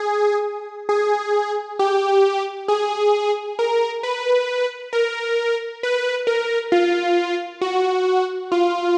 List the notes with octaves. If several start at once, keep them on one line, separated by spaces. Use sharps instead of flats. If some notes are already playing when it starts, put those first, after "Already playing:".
Already playing: G#4
G#4
G4
G#4
A#4
B4
A#4
B4
A#4
F4
F#4
F4